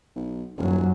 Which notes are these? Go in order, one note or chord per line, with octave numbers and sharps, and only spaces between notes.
B1
D#1 F#2 F#3